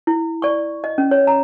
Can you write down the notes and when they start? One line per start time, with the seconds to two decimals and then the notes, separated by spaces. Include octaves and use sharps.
0.07 E4
0.42 D5 C#6
0.84 D#5
0.98 C#4
1.11 C#5
1.27 A#5